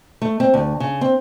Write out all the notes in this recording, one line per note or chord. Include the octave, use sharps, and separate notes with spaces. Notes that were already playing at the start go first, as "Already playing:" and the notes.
A3
C4
D2
C#3
C4